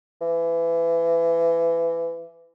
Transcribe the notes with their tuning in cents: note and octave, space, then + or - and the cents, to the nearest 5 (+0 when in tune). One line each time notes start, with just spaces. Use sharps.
E3 +25